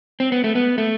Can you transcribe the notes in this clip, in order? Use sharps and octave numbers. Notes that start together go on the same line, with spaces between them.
C4
B3
A3
B3
A3